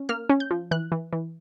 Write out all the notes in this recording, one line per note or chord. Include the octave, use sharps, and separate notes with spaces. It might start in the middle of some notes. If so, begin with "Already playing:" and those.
Already playing: C#4
A#3 F6
C#4
G6
F3
E3 F#6
E3
E3